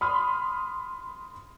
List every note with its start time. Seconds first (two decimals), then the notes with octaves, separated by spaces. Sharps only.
0.01 B5 C6 D#6 F6